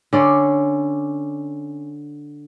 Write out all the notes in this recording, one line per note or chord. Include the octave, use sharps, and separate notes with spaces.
D3 C#4 D5